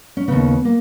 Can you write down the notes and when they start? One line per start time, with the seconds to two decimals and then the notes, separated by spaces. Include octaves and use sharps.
0.17 C#4
0.28 D#2 C#3 B3
0.65 A#3